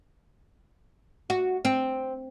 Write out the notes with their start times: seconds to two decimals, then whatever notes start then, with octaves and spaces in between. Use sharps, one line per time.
1.30 F#4
1.65 C4